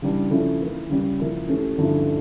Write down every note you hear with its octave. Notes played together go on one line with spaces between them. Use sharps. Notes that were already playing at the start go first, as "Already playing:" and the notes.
C#3 E3 G3 D4
C#3 F3 C#4 E4 A4
E3 A#3 E4
C#3 G3 C#4
C#3 F3 A#3 E4 A#4
E3 A3 C#4 G4
G2 D3 F3 C#4 E4